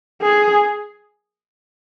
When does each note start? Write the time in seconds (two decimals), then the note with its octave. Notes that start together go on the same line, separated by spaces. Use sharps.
0.22 G#4